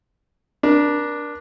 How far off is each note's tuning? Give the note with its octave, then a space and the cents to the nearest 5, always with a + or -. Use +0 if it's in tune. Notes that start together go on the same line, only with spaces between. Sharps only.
D4 +0 A#4 +35